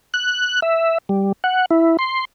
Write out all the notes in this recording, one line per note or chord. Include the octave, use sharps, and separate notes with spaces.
F#6
E5
G3
F#5
E4
C6